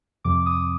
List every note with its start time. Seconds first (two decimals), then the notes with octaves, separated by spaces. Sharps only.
0.24 F2 C3 F3 D6
0.46 D#6